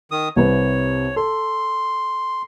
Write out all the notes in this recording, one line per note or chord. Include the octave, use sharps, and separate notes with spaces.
D#3 D#6
C2 C3 B4 C#5
A4 C6